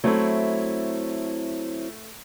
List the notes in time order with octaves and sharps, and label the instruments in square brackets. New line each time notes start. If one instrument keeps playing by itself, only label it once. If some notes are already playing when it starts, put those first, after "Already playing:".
[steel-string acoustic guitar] F#3 C4 E4 [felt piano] A3